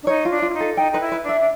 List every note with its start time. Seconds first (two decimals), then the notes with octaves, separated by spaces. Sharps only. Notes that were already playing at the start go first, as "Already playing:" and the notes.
0.03 D4
0.07 D#4 C#5
0.25 F4
0.31 D4
0.42 F4
0.50 E4
0.54 D#4
0.60 A4
0.77 D#4 G5
0.92 D#4 B4
1.01 E4
1.12 B4
1.24 D4
1.29 E5
1.41 D4